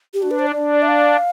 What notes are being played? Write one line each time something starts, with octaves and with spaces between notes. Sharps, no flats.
G4
D4 F#4
B4
C5
D5
D4
E5
F5